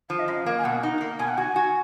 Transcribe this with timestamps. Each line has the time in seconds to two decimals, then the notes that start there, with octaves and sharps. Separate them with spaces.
0.10 F3 F5
0.19 D#5
0.28 F#2 F5
0.46 A#3
0.59 G#5
0.64 B2 F#5
0.83 D#4
1.01 A#3
1.19 B2 G#5
1.28 F#5
1.37 F#4 G#5
1.56 F#4